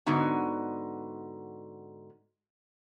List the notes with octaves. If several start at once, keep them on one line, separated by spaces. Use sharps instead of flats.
G#2 D3 B3 D#4 F#4